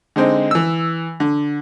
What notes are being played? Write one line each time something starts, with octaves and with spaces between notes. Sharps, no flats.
D3 G#3 C4 D#4
E3 E6
D3